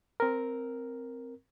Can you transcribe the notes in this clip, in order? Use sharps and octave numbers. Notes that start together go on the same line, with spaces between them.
C4 A#4